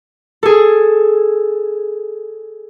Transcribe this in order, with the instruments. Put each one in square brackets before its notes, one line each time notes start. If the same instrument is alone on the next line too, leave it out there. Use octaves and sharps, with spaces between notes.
[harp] G#4 A4